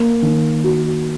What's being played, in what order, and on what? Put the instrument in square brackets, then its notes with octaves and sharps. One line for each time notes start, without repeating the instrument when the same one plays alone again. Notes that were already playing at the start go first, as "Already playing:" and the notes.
Already playing: [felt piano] A#3
D#3
F#4